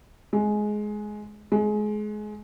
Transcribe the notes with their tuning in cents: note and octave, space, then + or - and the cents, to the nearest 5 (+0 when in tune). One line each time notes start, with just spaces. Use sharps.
G#3 +15
G#3 +25